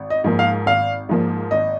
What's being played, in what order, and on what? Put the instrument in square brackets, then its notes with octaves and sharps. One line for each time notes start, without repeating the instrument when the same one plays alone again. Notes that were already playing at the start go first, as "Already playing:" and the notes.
Already playing: [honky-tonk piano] G#1
[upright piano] D#5
[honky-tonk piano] G#2 F3 A#3
[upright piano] F5
[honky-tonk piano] G#1 [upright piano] F5
[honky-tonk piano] G#2 F3 A#3
[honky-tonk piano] G#1 [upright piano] D#5